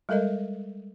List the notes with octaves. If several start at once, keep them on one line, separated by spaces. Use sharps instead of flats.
G3 G#3 A4 A#4 D#5